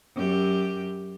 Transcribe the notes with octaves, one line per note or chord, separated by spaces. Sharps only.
F#2 G4